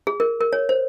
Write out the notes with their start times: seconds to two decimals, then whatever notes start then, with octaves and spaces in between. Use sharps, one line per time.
0.07 G#4
0.20 A#4
0.41 A#4
0.53 C#5
0.69 C5